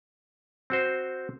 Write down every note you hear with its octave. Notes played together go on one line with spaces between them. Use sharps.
C4 F#4 C5